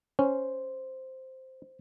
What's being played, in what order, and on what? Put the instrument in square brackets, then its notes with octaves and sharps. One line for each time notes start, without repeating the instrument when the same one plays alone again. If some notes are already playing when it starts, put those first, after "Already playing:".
[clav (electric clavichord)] C#4 [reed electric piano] C5